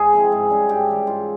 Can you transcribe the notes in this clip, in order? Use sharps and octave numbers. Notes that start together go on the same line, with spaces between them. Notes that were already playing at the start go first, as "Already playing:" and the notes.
Already playing: G#2 G#4
F3 C4 E4
G#2
G3 C#4
G#2 G4
E3 G3
G#2 F4